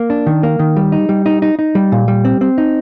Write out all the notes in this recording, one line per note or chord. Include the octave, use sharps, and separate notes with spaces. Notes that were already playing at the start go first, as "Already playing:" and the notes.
Already playing: A#3
D4
D#3
A#3
D#3
G3
D#4
G3
D#4
D#4
D#4
G3
A#2
G3
C4
C4
D#4